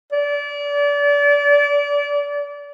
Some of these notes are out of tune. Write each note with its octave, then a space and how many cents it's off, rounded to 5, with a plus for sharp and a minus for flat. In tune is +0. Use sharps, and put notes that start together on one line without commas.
D5 -30